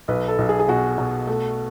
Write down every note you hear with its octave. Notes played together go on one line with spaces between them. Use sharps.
B1 B4
A4
B1
G#4
G#4
B2 F#4
B2
A3